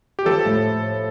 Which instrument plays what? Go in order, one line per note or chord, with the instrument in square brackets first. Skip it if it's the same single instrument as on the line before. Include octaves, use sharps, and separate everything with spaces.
[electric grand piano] G4
[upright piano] F3 [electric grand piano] A4
[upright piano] A2